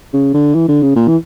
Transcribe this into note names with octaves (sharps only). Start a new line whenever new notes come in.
C#3
D3
E3
D3
C#3
A#2
E3